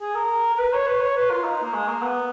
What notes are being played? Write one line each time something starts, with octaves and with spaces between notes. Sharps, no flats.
G#4
A#4
A#4
B4
C#5
B4
C#5
B4
F4
D#4
A#3
G#3
A#3
B3